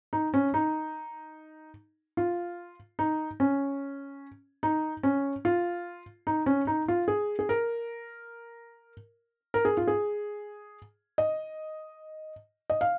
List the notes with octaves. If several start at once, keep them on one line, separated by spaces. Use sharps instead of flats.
D#4
C#4
D#4
F4
D#4
C#4
D#4
C#4
F4
D#4
C#4
D#4
F4
G#4
G#4
A#4
A#4
G#4
F4
G#4
D#5
D#5
F5